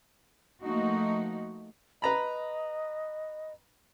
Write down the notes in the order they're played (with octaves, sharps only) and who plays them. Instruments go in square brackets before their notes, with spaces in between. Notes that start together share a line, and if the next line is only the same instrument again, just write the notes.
[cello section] F3 A3 A#3 D#4 F#4
[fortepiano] B4 A#5 B5 [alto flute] D#5